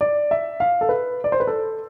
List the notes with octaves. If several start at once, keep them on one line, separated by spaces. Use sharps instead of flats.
D5
E5
F5
A4
B4
D5
C5
B4
A4